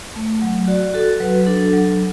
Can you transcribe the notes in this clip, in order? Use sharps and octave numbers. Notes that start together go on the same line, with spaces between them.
A3
F#3
F#4 D5
F#4 A4
F#3 B4
D4 A4
F#3